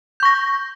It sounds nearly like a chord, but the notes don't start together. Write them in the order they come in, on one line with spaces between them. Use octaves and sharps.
G6 C#6 A#6